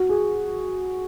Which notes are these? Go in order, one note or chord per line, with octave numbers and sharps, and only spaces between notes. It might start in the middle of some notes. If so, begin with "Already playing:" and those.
Already playing: F#4
G#4